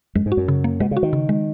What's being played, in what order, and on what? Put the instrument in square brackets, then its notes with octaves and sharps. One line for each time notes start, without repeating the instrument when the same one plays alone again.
[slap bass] F#2 [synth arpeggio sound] G#3
[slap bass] G#2
[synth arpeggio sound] F#4
[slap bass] F#2
[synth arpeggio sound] C#3
A#3
[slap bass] B2 [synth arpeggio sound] G#3
[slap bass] C#3
[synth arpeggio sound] F#4
[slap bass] D#3
[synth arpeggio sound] C#3
G#3